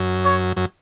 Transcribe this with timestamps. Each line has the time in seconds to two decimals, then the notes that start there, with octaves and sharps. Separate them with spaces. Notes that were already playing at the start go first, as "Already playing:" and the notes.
Already playing: F#2
0.25 C#5
0.57 F#2